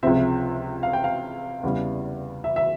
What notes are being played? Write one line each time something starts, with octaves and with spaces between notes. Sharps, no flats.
C#2 C3 F3 C4 E5
F5
G5
F5
E2 C#3 E3 G3
E5
E5